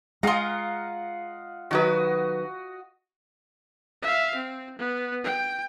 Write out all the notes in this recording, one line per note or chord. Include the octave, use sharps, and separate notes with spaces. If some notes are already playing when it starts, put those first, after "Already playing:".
G#3 F4 G#4 D#5 F5 F#5 A#5
D#3 F#3 F#4 B4 D#5
E5 F5
C4
B3
G5